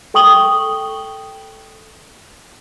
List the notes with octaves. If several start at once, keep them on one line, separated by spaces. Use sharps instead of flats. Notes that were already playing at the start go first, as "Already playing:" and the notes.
A4 G5 C#6 D#6 F#7 G7